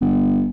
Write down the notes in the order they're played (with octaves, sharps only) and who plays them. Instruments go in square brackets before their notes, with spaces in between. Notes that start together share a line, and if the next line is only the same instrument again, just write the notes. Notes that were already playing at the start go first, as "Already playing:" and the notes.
[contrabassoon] G1